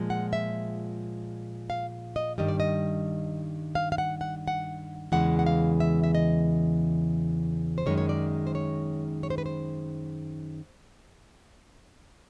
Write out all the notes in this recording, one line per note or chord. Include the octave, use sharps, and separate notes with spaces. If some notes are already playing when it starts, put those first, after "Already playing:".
Already playing: A#2 F3 G#3
F#5
E5
F5
D#5
G2 D#3 G3 D#5
D5
D#5
F5
F5
F#5
F#5
F#5
E2 C#3 E3 G#3 F#5
F#5
F5
E5
E5
D#5
C5
F#2 D#3 G#3 C#5
C#5
D5
C5
C#5
C#5
C5
B4
C5